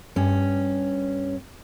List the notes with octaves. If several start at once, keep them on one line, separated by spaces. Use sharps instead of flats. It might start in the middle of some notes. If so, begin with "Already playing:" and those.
G2 C#4